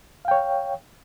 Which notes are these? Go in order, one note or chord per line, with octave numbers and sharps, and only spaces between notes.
C#5 F5 G5